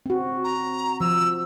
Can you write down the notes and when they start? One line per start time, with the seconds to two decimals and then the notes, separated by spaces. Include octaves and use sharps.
0.06 C4 F#4
0.44 A#5
1.01 F3 E6